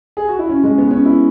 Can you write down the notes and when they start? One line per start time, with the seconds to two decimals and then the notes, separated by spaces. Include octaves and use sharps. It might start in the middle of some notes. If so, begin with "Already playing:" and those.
0.17 G#4
0.29 F#4
0.39 E4
0.49 C#4
0.64 G#3
0.78 B3
0.91 C#4
1.05 E4